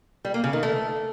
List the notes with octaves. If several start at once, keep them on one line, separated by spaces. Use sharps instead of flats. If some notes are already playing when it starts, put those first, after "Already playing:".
G3
A#3
C#3
D#3
A3